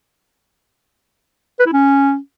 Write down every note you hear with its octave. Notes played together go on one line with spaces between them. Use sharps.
B4
E4
C#4